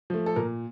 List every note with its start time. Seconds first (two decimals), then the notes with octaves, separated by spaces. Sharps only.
0.10 F3 A3
0.26 A4
0.36 A#2 A#4